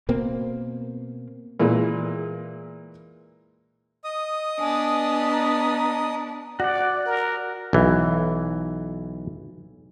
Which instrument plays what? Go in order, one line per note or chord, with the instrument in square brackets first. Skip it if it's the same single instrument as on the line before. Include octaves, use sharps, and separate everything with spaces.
[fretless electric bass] B2 A#3 C4
[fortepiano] A#2 E3 G#3
[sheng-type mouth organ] D#5 D#6
[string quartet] B3 D4 [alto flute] G#5
[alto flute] A#5
[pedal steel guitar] F#4 F#5 [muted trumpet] D5
[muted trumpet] A#4
[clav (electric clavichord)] B1 E3